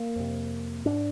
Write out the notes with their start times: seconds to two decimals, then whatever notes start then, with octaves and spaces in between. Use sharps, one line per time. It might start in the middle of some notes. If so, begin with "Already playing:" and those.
Already playing: A#3
0.16 F2 C3
0.85 G#2 D4